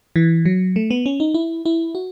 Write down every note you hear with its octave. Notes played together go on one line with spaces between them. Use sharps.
E3
F#3
A3
B3
C#4
D#4
E4
E4
F#4